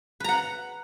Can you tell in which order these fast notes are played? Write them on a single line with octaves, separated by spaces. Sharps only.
B4 A#5 F#5